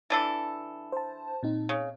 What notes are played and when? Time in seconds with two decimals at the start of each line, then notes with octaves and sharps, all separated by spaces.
0.10 E3 D4 A4
0.92 C5 A5
1.43 A#2 C4 D#4
1.69 C#3